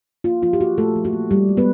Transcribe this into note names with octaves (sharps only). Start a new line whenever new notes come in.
A#3 F4
F3 F4
G4
A#3 F#4
A#2 A3 A4
F3
F#4
A#3
F3 G3 G4
G#3
B3 B4